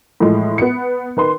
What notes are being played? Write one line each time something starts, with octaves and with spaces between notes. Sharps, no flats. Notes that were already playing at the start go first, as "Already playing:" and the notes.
A2 E3 F3 G#3 A3
B3 C#7
D#3 B4 C6